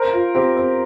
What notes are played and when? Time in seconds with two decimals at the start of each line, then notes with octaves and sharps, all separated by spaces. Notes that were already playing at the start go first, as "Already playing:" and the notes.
Already playing: A#4 C5
0.13 F4
0.35 C4 G4
0.57 C4